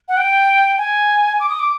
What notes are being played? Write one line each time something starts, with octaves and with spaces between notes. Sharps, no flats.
F#5
G5
G#5
D6
D#6
D6